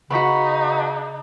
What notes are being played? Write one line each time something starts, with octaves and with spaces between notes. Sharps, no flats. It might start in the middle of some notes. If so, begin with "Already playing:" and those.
C#3 B3 D#4 F#4 B5 C#6 B6